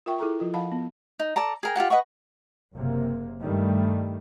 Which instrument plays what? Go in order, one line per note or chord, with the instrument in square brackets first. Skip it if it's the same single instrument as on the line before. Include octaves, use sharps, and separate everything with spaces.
[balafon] F4 A#4 E5 G5 C#6
E4 G#4 A4 A#5 C#6
F3 F4 A#4
F3 F5 F#5 A5 B5
B3
[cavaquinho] D#4
A4 D5 A5 A#5
G#4 A#4 G5
F4 G4 G#4 F#5
B4 D#5 F#5 C#6
[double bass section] F#1 C3 A#3
G2 D#3 G3 A3